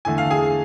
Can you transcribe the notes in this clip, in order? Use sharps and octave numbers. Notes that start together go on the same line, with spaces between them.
E2 D3 A3 G#5
F5
G#4 G#5